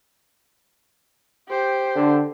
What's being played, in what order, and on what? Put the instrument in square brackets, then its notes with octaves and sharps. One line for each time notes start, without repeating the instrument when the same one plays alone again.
[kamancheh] G4 C5
[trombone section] D3